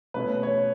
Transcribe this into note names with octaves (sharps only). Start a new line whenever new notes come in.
B2 A3 C#4 B4
C#5